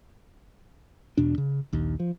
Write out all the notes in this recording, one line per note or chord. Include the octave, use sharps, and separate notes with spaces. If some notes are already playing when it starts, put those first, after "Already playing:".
E2 B2 D4
C#3
A#1 D#2
F3